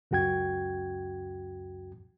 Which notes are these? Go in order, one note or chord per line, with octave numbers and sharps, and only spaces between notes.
C#2 F#2 F#4 G5 G#6